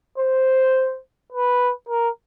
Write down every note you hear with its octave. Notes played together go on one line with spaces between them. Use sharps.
C5
B4
A#4